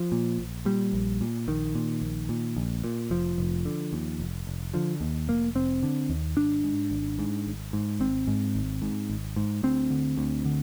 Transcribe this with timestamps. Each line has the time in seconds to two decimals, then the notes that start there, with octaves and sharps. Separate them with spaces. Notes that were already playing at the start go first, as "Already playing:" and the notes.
Already playing: F3
0.12 A#2
0.39 A#1
0.65 A#2 G3
0.93 A#1
1.21 A#2
1.47 A#1 D#3
1.75 A#2
2.01 A#1
2.29 A#2
2.56 A#1
2.84 A#2
3.10 F1 F3
3.38 F1
3.65 D3
3.93 D#2
4.20 F1
4.47 F1
4.74 D3 F3
5.01 D#2
5.28 F1 A#3
5.55 F1 C4
5.83 D3
6.09 D#2
6.37 G#1 D4
6.64 G#2
6.91 G#1
7.19 G#2
7.46 G#1
7.73 G#2
8.00 G#1 C4
8.27 G#2
8.55 G#1
8.82 G#2
9.10 G#1
9.36 G#2
9.63 D2 C4
9.90 D3
10.17 D2
10.45 D3